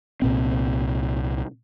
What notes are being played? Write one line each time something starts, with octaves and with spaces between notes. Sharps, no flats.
C2 A#2 C4